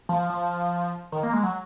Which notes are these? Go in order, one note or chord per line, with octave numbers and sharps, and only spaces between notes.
F3
F3
D#3
A#3
G#3
F#3